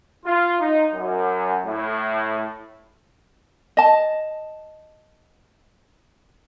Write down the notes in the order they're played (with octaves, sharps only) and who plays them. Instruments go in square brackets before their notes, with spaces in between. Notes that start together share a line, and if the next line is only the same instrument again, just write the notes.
[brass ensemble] F4
D#4
F#2
A2
[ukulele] D#5 A5